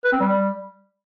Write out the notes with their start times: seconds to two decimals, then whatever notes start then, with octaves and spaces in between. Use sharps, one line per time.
0.04 B4
0.12 C4
0.20 G3